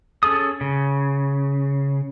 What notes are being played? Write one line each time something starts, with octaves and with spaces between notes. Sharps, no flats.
C#4 G#4 A4 D#6
C#3